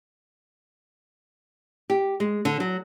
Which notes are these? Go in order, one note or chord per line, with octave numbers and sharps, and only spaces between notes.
G4
G#3
D3
F#3